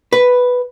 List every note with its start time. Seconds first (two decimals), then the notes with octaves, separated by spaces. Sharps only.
0.13 B4